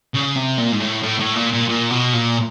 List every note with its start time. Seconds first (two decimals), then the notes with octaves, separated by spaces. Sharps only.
0.15 C#3
0.37 C3
0.58 A#2
0.72 G#2
0.80 A2
1.03 A2
1.20 A2
1.35 A#2
1.53 A#2
1.69 A#2
1.91 B2
2.13 A#2